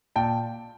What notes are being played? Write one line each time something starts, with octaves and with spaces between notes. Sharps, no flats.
A#2 G5 A5